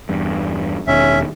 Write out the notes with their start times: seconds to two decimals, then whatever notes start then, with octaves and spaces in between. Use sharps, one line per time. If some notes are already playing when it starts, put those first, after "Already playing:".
0.09 E2 G2
0.87 E1 D#3 C#4 E5